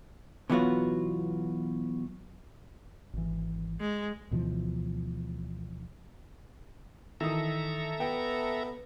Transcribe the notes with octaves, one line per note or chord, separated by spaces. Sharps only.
B2 E3 F#3 B3 F4 F#4
G#1 E3
G#3
D2 B2 E3 F3
D#3 E3 A4 E5 A#5 D#6
B3 G5